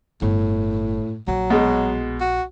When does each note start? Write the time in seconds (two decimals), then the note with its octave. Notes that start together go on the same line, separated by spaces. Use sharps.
0.22 G1 A2
1.28 A#1 F#3
1.50 B2 G#3
2.21 F#4